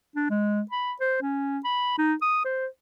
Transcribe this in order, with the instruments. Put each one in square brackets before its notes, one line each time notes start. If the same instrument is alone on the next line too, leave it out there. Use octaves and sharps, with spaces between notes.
[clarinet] D4
G#3
B5
C5
C#4
B5
D#4
D#6
C5